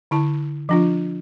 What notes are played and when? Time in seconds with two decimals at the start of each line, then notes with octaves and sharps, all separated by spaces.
0.11 D3 E4 A5
0.69 F3 D4 F4